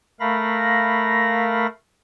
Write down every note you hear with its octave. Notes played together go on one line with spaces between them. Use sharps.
A3 A#4 F5 B5 A#6